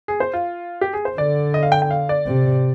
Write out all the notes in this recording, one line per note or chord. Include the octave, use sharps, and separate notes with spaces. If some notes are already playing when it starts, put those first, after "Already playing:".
G#4
C5
F4
G4
G#4
C5
D3 D5
D#5
F5
G5
G5
F5
D5
C3